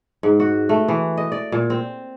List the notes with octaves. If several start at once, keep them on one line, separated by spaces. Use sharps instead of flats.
G#2
F#4
A3
E3
D#5
D5
A#2
C4